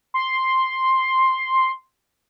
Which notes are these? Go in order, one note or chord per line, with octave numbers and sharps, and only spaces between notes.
C6